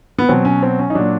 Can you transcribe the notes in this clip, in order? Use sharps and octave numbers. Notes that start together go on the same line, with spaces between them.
B3
B2 F#3 C4
C#4
C4
C#4
D#4
A#2 F#3 D4